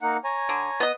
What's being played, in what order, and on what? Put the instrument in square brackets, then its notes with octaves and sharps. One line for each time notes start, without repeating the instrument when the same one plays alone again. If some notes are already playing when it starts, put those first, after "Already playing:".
[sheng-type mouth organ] A#3 D#4 F#5
C#5 G#5 A#5
[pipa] D3
B3 D#5